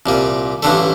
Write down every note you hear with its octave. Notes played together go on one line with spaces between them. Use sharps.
C2 A#2 G3
A1 G2 D3 A3